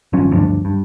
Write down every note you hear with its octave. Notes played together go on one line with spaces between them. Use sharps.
G#1 G2 F3 C#4
D2 G2 F3 D4
G2